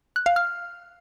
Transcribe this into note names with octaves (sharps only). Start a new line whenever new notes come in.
F#6
F5
F6